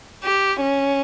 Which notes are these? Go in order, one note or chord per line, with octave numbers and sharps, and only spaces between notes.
G4
C#4